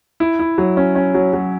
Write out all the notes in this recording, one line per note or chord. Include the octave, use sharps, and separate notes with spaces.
E4
E4
F#3
C#4
C#4
F#3
F#3